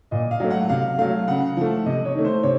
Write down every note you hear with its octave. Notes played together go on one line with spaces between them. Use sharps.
A#2 D#5
F5
F#3 A3
F#5
C3 F5
F#3 A3 F5
C#3 F#5
F3 A3
C3 D#5
C#5
D#3 A3
C5
C3 C#5